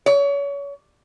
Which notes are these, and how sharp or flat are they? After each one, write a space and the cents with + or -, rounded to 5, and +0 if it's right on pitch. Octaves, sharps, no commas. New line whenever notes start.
C#5 +30